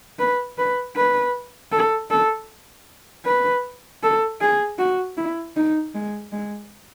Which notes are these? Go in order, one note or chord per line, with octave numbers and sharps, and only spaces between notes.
B4
B4
B4
A4
A4
B4
A4
G#4
F#4
E4
D#4
G#3
G#3